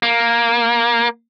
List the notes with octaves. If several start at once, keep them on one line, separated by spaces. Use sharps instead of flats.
A#3